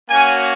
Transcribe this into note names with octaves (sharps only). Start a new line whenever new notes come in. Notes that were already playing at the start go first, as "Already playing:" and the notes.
A#3 C#4 F#4 G#5